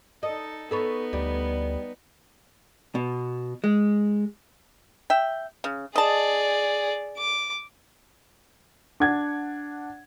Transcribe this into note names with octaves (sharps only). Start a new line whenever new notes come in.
D#4 A4 D#5
B3 D#4 A4 B4 C#5
D2 G3
B2
G#3
E5 G5
C#3
G#4 D5 D#5 A5
D6
D4 F#5 G#6